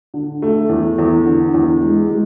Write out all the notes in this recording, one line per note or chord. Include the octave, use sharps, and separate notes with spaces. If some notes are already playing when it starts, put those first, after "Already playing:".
D3
A3
E2
E2
D3
E2
G#3
G#3